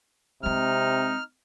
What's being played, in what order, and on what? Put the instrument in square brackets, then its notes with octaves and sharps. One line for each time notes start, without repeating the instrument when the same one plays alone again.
[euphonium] C3 [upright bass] G#3 C4 [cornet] D#4 [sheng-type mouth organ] F6